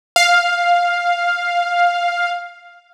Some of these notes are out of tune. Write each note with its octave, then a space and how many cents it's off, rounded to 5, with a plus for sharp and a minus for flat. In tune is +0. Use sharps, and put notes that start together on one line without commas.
F5 +5